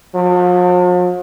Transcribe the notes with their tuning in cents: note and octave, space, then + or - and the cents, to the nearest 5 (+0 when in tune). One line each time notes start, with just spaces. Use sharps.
F3 +45